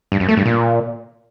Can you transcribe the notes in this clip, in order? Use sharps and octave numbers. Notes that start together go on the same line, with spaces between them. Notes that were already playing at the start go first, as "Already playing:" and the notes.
G2
F#2
A3
G2
A#2